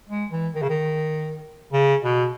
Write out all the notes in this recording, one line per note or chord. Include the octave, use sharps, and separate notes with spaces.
G#3
E3
D#3
C#3
D#3
C#3
B2